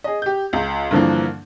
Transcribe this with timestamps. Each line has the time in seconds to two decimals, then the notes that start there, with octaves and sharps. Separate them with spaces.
0.04 G#4 D#5
0.22 G4 G6
0.53 C#2
0.91 G2 D3 E3 F3 A#3